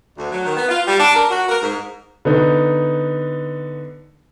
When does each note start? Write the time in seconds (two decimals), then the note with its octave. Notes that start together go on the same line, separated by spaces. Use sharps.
0.16 D2
0.32 F#3
0.46 D#3
0.57 B3
0.69 F4
0.86 G3
1.00 D4
1.15 A#4
1.31 F#4
1.48 A#4
1.62 G#2
2.25 D3 B3 D#4